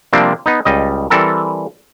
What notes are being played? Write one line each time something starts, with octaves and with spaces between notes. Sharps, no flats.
C3 F3 G3 A#3 C4 D4
B3 D#4
C#2 G3 D#5
E3 G3 C4 A4 A#4